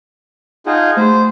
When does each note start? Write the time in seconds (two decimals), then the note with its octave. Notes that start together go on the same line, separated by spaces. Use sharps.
0.66 D#4 F4 G#4 F#5 A5 G6
0.96 A3 G#4 C5 B5